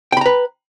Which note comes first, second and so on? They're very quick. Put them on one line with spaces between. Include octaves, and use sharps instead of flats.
G5 B5 A#5 B4